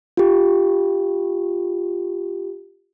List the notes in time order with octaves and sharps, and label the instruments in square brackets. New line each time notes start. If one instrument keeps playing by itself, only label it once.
[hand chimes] F4 G4